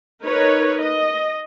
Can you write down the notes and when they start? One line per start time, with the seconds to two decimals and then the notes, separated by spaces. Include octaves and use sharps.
0.24 D#4 A#4 B4 C#5
0.81 D#5